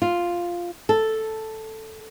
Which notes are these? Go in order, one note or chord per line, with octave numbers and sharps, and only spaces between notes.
F4
A4